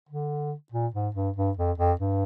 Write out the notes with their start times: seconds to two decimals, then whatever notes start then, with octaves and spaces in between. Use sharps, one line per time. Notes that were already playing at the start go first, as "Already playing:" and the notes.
0.09 D3
0.72 A#2
0.94 G#2
1.15 G2
1.36 G2
1.57 F2
1.78 F2
1.99 G2